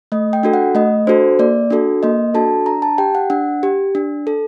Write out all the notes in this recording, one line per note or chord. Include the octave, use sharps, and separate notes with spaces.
A3 D#5
G5
D4 F#4 A4
F#5
A3 D#5
D4 F#4 A4 C5
A#3 D5
D4 F#4 A4
A#3 D#5
D4 F#4 A4 A5
D4 A#5
A5
G4 G5
F#5
D4 F#5
G4
D4
A4